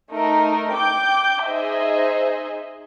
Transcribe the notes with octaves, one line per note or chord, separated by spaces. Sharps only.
A3 D#4 A#4
G5 D6 G6
D#4 G#4 C5 D#5 E5